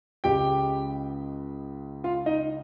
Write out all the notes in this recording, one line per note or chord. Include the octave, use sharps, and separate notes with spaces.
C#2 C#3 G#3 G4 G5
F4 F5
D#4 D#5